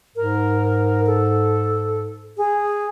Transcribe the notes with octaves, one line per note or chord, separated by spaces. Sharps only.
G#2 A#4
A4
G#4